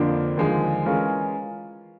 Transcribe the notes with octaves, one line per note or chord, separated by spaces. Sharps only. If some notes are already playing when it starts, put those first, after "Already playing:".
Already playing: F2 D3 F3 A#3 D4
D#2 D3 F3 G#3
E3 G#3 C#4 F4 A#4